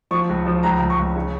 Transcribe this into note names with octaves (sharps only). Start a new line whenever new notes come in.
F3 C#6
C#2
F3
C#2 A#5
C#2
C#6
C#2
C#3